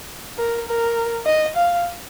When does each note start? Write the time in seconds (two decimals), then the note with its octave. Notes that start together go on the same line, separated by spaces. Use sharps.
0.38 A#4
0.68 A#4
1.26 D#5
1.56 F5